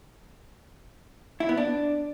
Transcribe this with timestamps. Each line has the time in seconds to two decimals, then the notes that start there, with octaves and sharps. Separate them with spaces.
1.40 E4
1.49 B3
1.57 D4